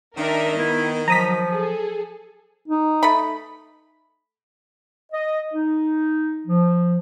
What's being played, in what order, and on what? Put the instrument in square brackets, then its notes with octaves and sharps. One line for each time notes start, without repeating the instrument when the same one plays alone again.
[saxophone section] D#3 [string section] D4 A#4 E5
[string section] B3 [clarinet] E4
[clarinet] F3 [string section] F#3 [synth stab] A#5 D#6 B6
[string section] G#4 A4
[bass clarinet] D#4
[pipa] A3 B5
[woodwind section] D#5
D#4
F3